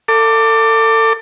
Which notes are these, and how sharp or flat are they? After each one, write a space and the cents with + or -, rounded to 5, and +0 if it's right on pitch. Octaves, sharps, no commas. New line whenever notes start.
A4 +30 D6 +0